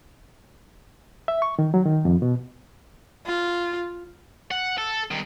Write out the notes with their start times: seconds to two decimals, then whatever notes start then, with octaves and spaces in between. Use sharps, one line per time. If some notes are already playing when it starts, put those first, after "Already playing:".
1.28 E5
1.42 C#6
1.59 D#3
1.74 F#3
1.85 D#3
2.05 F2
2.22 B2
3.27 F4
4.51 F#5
4.78 A4
5.11 G2 D#3